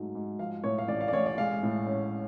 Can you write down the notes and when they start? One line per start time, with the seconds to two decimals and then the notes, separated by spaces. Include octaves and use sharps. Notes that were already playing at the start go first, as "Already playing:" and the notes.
Already playing: G#2 F#3 A3
0.15 G#2
0.39 F3 F5
0.64 A2 C#5
0.78 F5
0.88 A1 D5
1.01 F5
1.08 D5
1.13 A1 C#5
1.26 D5
1.38 G#3 F5
1.63 A2
1.87 C#4